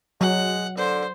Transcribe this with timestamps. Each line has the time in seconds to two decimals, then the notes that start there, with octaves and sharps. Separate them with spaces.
0.21 F#3 G#3 F#5
0.77 D3 C5